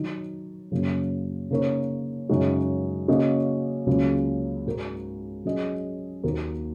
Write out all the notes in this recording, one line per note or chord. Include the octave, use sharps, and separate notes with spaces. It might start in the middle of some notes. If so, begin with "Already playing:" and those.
Already playing: D#3 F#3 D#4
F#2 C#3 F#3 A#3
C#3 A#3 D#4 A#4 C#5
F#2 C#3 G#3 D#4 F#4
C#3 A#3 C#4 F#4 D#5
C#2 C#3 F#3 A#3
G#2 G#3 F#4 A#4
F#3 C#4 G#4 D#5
D#2 D#3 A#3 F#4 A#4